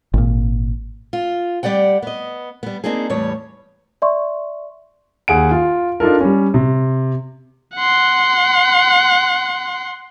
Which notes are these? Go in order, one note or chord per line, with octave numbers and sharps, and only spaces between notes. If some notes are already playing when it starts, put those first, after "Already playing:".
G#1 A#2
F4
G3 G4 D5 F#5 G5
B3 D#5
G3 B3
A#3 C4 D4 D#4 G#4
E2 A2 G3 C#5
D5 E5 C6 C#6
D#2 G#4 F#5 D7
F4
D4 D#4 F4 A4 A#4
G3 C#4
C3
F#5 C6